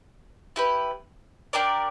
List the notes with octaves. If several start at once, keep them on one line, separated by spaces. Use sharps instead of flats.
E4 G4 B4
D4 G4 A#4 D5